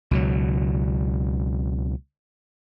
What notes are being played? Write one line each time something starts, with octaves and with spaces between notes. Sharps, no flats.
C#2 B2 F#3